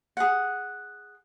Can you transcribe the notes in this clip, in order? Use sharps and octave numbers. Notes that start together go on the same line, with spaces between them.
G#4 F#5